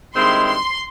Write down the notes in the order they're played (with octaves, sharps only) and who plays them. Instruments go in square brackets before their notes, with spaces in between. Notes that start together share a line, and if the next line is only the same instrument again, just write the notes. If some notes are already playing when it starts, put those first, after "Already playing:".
[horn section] G2 D#3 G#3 C4 E4 [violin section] C6
[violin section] C6